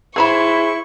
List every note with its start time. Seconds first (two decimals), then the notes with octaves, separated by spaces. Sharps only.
0.16 E3 D#4 E4 G#4 C5 B5 C#6